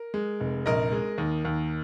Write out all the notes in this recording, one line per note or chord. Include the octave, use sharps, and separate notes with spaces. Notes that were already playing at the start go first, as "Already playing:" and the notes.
Already playing: A#4
G#3
F1
A#1 A#4 D#5
G#3
D#2
D#2